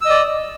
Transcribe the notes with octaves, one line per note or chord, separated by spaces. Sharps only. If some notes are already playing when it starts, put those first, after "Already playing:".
D5 D#5 E6